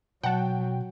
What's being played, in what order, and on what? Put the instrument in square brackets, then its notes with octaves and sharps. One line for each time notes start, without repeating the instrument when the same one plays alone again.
[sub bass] B2 [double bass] F#3 [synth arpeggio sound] F#5 A5 [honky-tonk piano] G5